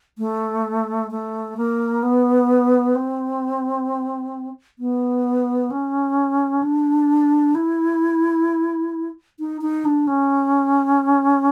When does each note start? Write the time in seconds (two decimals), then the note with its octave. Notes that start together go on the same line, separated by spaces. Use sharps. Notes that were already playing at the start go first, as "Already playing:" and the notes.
0.18 A3
1.11 A3
1.57 A#3
2.03 B3
2.95 C4
4.79 B3
5.71 C#4
6.63 D4
7.55 E4
9.39 D#4
9.62 D#4
9.85 D4
10.07 C#4